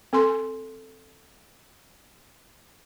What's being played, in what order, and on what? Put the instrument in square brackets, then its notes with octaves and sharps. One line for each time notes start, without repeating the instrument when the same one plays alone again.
[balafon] C4 A4 G#5 C6